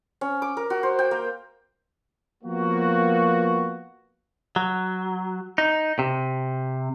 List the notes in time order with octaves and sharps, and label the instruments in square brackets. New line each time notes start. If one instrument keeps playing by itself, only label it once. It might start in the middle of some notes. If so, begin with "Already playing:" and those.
[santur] C#4
D6
A#4
F#4
C5
G5
A#3
[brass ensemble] F3 A#3 B3 F#4
[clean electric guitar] F#3
D#4
C3